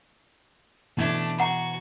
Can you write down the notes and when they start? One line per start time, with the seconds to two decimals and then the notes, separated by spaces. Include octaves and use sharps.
0.97 B2 E3 A3 D4 G#6
1.40 F#4 F#5 A#5 C#6